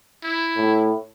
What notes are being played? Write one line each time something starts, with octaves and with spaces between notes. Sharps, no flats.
E4
A2